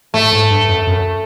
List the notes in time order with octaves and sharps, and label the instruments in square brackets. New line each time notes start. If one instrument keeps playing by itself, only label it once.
[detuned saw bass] A2 [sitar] A3
[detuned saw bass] G#2
G2
F#2
F#2